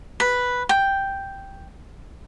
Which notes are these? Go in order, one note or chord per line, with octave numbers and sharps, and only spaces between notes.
B4
G5